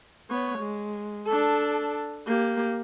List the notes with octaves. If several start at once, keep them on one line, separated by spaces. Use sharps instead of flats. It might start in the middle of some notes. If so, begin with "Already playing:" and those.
B3 C#5
G#3
D4 A4
A#3 G4